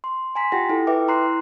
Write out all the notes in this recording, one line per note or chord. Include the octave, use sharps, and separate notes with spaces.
C6
G#5 A#5 C6 B6
F4 G4 F#5 G5 A#6
E4 A4
B4 E5 G5 D6
E4 A#5 C6 F#6 C7